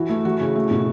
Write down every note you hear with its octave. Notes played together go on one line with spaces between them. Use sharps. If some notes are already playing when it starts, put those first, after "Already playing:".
Already playing: E3 E4 F#4
A3
E3 F#4
C#3
A3
B2